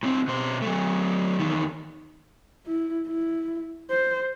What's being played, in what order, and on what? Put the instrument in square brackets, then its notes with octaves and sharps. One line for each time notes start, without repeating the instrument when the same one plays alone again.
[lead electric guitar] A2 C4
B2 C5
F#3 A3
E2 D#3
[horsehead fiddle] E4
E4
C5